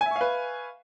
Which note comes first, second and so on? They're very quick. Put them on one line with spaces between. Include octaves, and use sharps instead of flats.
G#5 E5 C#6 F5 B4